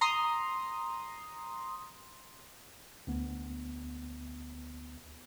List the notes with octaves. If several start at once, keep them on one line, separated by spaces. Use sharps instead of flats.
A#5 C6 D#6
D2 B3